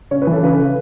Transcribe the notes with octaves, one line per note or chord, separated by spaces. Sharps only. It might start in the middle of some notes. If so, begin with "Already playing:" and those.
C#3 C#5
B4
E3
A4
C#3 B4
C#3